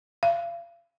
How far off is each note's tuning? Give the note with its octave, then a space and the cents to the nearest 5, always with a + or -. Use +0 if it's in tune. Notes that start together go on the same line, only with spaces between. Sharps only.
F5 -35